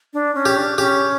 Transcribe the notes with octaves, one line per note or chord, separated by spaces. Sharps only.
D4
C#4
G4
D4
C#4 G4